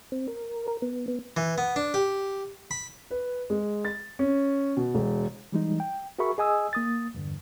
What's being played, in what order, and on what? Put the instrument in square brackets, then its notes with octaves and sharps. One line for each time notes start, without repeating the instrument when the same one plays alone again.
[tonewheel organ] C4
A#4
A#4
B3
B3
[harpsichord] E3
B3
D4
G4
B5
[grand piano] B4
G#3
A6
C#4
B2
E1
[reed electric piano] E3 G3 G#3 D#4
G5
F#4 G#4 A#4 E5 B5 C#6
G#4 D#5 G#5 D#6 E6
A#3 D#6 A6
E2 G2 D3